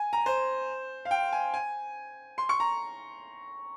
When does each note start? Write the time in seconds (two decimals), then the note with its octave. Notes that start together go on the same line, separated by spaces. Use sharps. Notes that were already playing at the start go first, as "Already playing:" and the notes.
Already playing: G#5
0.13 A#5
0.26 C5
1.05 F5
1.11 G5
1.33 G#5
1.54 G#5
2.38 C6
2.49 C#6
2.60 A#5